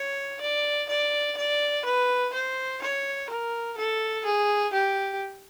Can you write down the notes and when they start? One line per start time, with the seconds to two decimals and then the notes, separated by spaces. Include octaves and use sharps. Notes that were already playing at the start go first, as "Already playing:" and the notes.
Already playing: C#5
0.41 D5
0.89 D5
1.37 D5
1.85 B4
2.33 C5
2.82 C#5
3.30 A#4
3.77 A4
4.26 G#4
4.74 G4